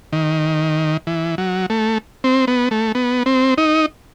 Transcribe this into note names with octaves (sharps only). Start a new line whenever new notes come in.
D#3
E3
F#3
A3
C4
B3
A3
B3
C4
D#4